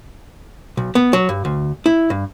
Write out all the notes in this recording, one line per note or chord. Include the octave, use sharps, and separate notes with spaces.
B1
B3
F#3
G2
D2
E4
G2